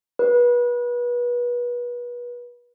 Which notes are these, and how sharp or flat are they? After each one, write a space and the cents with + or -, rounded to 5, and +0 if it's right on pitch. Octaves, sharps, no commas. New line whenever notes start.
B4 -30